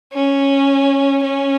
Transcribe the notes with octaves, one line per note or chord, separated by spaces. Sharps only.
C#4
C#4